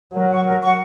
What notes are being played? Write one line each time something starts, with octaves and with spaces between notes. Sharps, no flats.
F#3 A#4
F#5 C#6
A#4
F#5 C#6